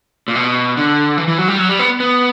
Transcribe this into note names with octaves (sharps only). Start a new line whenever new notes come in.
A#2
B2
D3
E3
E3
F#3
G3
F#3
G3
B3
B3